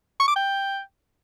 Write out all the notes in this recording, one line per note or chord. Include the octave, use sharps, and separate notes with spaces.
C#6
D6
G5